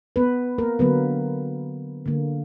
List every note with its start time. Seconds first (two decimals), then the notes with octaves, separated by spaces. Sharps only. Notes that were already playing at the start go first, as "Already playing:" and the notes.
0.16 B3 B4
0.58 A#3 A#4
0.79 D3 F#3 A#3 B3 B4
2.06 D3 A#3